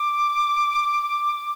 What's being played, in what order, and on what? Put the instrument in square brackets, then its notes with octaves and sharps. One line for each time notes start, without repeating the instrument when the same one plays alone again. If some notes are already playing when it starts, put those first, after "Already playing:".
Already playing: [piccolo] D6